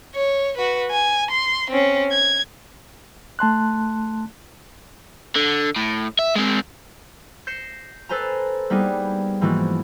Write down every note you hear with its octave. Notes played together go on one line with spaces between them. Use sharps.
C#5
F#4 B4
G#5
C6
C4 C#4
G#6
A3 A5 C6 F#6
D3
A2
E5
G#3 C4
G6 A#6 C7 C#7 E7
A4 B4 C5 G#5 A#5
G3 A#3 B3 D#4 G#4
G#2 E3 F3 A#3 F#4